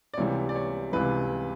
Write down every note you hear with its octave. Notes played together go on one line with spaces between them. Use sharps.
D5
C#2 C3 E3 G3 C#5
D5
C#5
C#2 C3 E3 G3 B4